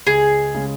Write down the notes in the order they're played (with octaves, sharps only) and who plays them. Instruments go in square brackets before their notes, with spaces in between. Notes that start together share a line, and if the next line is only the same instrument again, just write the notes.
[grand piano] C#2 [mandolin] G#4
[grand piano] C#3 G#3 C#4